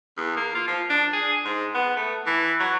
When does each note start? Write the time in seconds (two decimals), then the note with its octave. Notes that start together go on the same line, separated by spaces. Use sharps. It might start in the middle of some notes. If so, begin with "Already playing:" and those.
0.18 E2
0.37 A#3
0.55 F4
0.68 F3
0.90 D4
1.13 G#4
1.45 G#2
1.75 B3
1.96 A3
2.26 E3
2.60 F#3